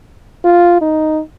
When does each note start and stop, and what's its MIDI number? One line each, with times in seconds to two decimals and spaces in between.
0.45 0.79 65
0.81 1.20 63